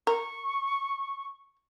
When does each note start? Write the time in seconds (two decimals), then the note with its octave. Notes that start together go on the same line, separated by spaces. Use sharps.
0.07 A#4 C#6